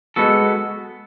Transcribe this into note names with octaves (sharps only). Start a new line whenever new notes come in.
G#3 B3 F#4 A4